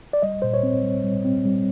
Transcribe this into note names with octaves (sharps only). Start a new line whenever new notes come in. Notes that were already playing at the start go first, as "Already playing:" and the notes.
D5
G3 D#5
A#2 C5
C#5
C4
G3
G3
C4
G3